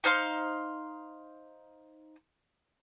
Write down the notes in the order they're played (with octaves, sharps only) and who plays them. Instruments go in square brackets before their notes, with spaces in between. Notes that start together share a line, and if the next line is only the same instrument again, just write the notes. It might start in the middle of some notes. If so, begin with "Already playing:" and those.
[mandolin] D#4 C5 F5 C6